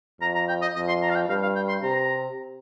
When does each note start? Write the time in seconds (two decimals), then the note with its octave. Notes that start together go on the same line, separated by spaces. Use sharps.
0.21 F2 A#5
0.35 A#5
0.48 G5
0.61 D#5
0.75 F2 D#5
0.88 C6
1.02 A#5
1.10 F5
1.15 G5
1.29 G2 F5
1.43 F5
1.56 G5
1.69 C6
1.82 C3 A#5